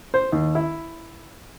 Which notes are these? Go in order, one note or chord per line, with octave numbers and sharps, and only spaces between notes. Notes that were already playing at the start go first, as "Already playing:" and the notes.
C5
D#2
E4